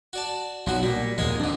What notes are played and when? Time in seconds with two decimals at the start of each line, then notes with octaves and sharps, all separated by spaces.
0.13 F#4 D5 A5
0.67 B1 F3 F#3 F#4
0.83 A#2 G3
1.18 D#2 A#2 F3 G#3 A#3 G#4
1.40 F2 D3 D4